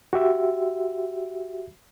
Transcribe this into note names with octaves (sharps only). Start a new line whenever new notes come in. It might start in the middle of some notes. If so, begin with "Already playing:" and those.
F#4 G4 E5